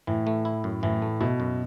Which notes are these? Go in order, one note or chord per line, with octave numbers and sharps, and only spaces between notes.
A2 E3
A3
E4
F#2
A2 E3
A3
B2 E4
F#2